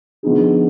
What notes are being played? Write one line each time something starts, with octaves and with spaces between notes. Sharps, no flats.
D3 F3 B3 D#4 G#4